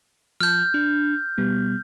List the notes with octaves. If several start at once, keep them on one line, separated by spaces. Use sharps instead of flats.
F3 A5 F6 G6
D4
B2 G3 B3